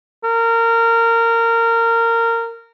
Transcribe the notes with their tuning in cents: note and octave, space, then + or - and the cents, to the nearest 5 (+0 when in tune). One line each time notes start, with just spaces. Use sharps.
A#4 -20